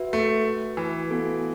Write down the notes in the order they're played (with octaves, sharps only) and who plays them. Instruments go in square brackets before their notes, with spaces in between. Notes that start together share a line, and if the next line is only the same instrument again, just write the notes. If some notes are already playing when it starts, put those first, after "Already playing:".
Already playing: [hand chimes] F#4 B4 E5
[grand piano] A3
E3
[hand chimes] B3 F#4 A4